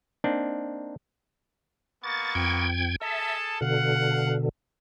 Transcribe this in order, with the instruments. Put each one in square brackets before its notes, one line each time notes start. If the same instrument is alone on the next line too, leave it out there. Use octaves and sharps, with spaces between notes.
[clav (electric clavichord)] A#3 C4 D4 D#4
[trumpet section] A#3 B3 C#6 [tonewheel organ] A6
[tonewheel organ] F2 G5 G#6
[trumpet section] G#4 A4 A5 [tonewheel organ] E5
[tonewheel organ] B2 D3 [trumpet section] F5 F#5